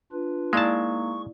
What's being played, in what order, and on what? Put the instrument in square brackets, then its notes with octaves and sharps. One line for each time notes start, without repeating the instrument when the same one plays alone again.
[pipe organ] D4 F4 B4
[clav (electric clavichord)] G#3 A5 [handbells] A#3 D#4 [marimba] E4 D5 [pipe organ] C#6